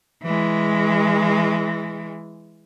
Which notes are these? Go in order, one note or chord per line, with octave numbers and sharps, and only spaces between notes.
E3 G#3